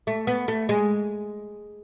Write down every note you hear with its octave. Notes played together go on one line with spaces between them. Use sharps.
A3
B3
A3
G#3